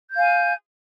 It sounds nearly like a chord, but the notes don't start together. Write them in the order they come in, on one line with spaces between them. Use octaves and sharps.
G6 F5 G#5